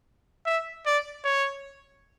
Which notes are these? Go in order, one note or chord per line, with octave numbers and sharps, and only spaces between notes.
E5
D5
C#5